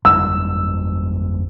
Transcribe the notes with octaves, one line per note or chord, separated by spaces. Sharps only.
G1 F2 G3 E6